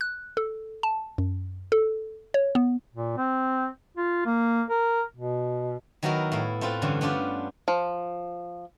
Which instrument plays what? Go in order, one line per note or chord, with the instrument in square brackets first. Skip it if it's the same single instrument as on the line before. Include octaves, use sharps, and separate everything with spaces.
[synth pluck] F#6
A4
A5
F#2
A4
C#5
B3
[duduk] A#2
C4
F4
A#3
A#4
B2
[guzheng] D#3 F#3 B3 E4 F#4 A#4
A2 E4 F5
A3 C4 F4 B4
G2 D3 E3 C#4
B3 C#4 D4 F4 G4
[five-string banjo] F3